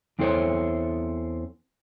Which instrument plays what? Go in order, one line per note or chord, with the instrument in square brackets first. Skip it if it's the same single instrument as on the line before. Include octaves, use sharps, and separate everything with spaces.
[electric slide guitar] E2 C4 E4 A4 C5 C#5